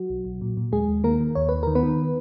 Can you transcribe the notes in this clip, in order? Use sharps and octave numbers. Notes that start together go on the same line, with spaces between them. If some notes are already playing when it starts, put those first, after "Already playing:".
Already playing: F#3 F#4
B1
B1
A#2
A#2
D#2 G#3 G#4
D#2
D#3 A#3 A#4
D#3
D#2 C#5
D#2 B4
D#3 A#4
B3 B4
D#3